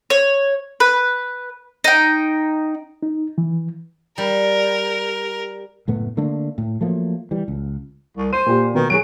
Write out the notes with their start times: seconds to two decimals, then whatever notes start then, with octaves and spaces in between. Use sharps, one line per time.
0.10 C#5
0.80 B4
1.84 D#4 G5
3.03 D#4
3.38 E3
4.18 G3 A#4
5.88 F#1 A2 A3 B3
6.17 D3 A3 A#3 D4
6.58 A2
6.81 F3 F#3 A3 A#3
7.31 E3 G3
7.48 C#2
8.17 C2
8.33 C5 D#7
8.46 A#2 G4
8.75 B2 D#3 B3
8.90 F#3 G#4 D7